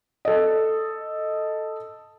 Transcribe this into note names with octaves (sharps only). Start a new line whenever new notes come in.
A4 D#5